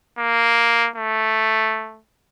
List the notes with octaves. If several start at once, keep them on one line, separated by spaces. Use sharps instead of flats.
A#3
A3